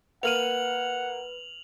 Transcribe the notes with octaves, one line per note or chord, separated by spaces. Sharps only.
A#3 B4 F#5 F6 D#7 F7 F#7